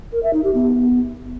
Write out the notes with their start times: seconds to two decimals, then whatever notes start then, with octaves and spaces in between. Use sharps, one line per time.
0.12 A#4
0.23 E5
0.33 D#4
0.44 G4
0.54 B3